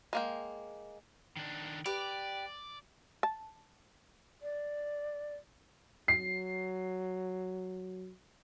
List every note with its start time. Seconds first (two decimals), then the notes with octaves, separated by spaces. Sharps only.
0.13 G#3 A#3 G5
1.37 D#3 D4
1.86 G4 B4 D5
3.23 A5
4.42 D5
6.08 F#3 C7